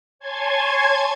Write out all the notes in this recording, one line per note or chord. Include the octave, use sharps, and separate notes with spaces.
C#5 G#5 A5 C6 G#6